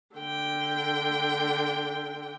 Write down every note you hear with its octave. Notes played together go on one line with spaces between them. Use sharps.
D3 G5